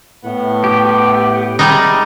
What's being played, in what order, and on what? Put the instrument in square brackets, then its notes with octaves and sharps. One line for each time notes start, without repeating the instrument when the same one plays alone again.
[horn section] A2 B3
[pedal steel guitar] G4
[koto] G3 G#3 D#4